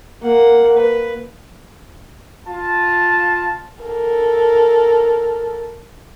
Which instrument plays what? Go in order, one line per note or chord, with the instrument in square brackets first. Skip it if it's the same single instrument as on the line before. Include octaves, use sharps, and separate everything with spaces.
[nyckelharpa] A#3 F#5
B4
[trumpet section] F4 A5
[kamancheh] A4 A#4